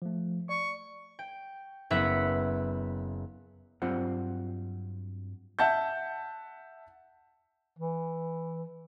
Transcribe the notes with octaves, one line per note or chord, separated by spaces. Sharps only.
F3 A3
D5 C#6
G5
F#1 B3 E5 F#5 B6
G2 F#3 C4 F4 C5 F#5
E5 F#5 A5 G6
E3